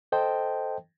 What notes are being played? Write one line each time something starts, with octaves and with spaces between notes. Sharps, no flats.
A4 C5 D#5 G5 A5